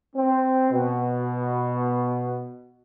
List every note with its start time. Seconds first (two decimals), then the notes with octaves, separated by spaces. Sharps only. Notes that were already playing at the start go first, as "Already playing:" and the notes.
0.16 C4
0.71 B2